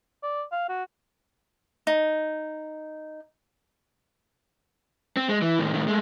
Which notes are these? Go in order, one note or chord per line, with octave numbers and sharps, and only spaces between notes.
D5
F5
F#4
D#4
C4
G#3
E3
A2 D#3
A2 D#3
G#3 A3